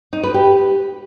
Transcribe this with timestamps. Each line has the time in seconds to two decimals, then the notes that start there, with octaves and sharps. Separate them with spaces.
0.13 D#4
0.23 B4
0.34 G4